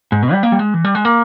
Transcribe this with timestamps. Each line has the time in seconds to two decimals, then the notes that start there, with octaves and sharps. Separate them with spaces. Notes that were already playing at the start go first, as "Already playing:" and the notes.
0.12 G#2
0.23 B2
0.33 G3
0.43 A#3
0.52 G3
0.59 G#3
0.74 E3
0.85 G3
0.95 G#3
1.05 A#3